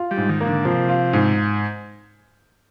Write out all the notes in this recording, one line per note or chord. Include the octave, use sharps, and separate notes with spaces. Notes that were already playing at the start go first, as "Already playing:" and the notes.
Already playing: F4
G3
G#2
D#3
A#3
D3
C3 F3
F4
G#2